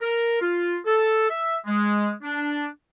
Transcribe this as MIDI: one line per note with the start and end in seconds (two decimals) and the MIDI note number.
0.02 0.41 70
0.41 0.77 65
0.86 1.27 69
1.30 1.57 76
1.66 2.12 56
2.23 2.67 62